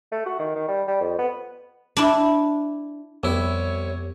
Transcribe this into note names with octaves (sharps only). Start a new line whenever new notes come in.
A3
F#4
D#3
D#3
G3
G3
F2
B3
D4 E4
C2 F2 B3 E4 G4 C#5